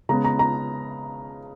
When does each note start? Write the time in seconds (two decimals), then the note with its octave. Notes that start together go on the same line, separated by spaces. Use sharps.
0.09 C#3 G#3 B3 A#5
0.24 A#5
0.39 A#5